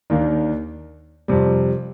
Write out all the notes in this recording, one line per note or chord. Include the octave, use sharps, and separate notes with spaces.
D#2 D#3 A#3 D4
F2 C3 G3